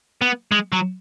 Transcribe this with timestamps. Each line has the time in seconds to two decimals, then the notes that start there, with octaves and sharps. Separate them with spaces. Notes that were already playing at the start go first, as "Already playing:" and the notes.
0.22 B3
0.52 G#3
0.72 F#3